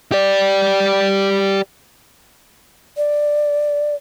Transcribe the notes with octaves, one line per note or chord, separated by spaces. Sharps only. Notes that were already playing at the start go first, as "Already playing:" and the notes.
G4 D5
D5